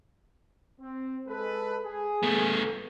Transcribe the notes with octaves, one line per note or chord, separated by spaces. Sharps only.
C4
G#3 A4 B4
G#4
A3 B3